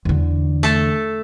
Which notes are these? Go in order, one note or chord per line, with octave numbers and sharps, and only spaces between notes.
E2 D3
A3 A4